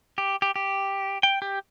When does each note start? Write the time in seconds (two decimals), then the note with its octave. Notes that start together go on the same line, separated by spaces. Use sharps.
0.18 G4
0.42 G4
0.56 G4
1.23 G5
1.42 G4